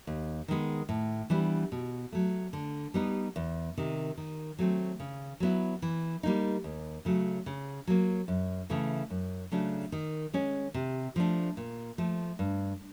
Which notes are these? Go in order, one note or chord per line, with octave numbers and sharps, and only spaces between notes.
D#2
D#3 G#3 B3
A2
E3 G3 B3 D4
B2
F#3 A3
D3
G3 B3 D#4
E2
C3 D#3
D#3
F#3 A3 C4
C#3
F#3 B3 E4
E3
G3 A#3 D#4
D#2
C#3 F#3 A3
C#3
F#3 A#3
F#2
C#3 E3 A3
F#2
C#3 F#3 A3 D4
D#3
G#3 C#4
C3
F3 A3 D4
A#2
F3 A3
G2